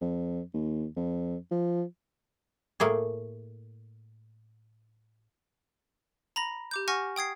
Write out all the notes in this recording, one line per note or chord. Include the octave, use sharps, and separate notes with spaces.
F2
D#2
F2
F3
A2 A3 A#3 G#4
A#5 B5 A#6
G4 D6 G6
F#5 G#5 C#6 F6 A#6
G5 D#6 G#6 C7